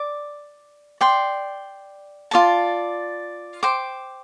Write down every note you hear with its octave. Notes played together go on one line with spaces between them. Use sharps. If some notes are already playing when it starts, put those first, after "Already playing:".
Already playing: D5 D6
D5 G5 C6
F4 D5 A5
C5 G5 D6